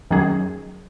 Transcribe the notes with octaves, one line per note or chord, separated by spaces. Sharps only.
F#2 D#3 F#3 C#4 G#4